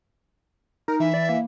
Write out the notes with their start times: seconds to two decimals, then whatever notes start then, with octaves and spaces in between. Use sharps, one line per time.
0.88 D#4 A#4
1.00 E3 E5
1.14 D5
1.29 A#3